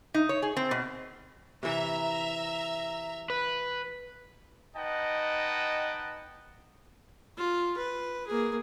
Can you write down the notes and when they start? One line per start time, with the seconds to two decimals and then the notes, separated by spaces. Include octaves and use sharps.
0.14 D#4
0.29 C#5
0.42 G#4
0.57 C4
0.71 B2
1.63 C3 E3 E5 A#5
3.30 B4
4.76 D#4 B4 D#5 F#5 G5 A5
7.37 F4
7.78 B4
8.27 A#3 G#4